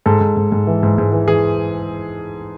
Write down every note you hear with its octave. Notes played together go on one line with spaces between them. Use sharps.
G#2 A4
G#2
G#2
G#2
E3
G#2
G#2
E3
E3 G#4